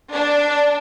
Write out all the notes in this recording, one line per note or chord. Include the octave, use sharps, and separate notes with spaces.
D4